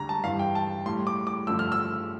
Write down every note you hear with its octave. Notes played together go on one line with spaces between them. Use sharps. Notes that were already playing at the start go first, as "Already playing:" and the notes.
Already playing: D2 D3 G3 A#5
A5
G2 E3 G3 F5
G5
A5
A2 G3 C6
D6
D6
G2 D3 F3 A3 E6
F6
E6